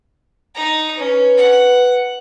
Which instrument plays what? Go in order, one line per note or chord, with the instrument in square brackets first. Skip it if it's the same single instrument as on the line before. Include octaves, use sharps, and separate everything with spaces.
[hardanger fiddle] D#4 A#5
[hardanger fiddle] C#4 [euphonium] B4
[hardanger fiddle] F#5